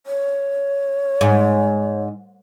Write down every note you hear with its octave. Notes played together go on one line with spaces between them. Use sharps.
C#5
G#2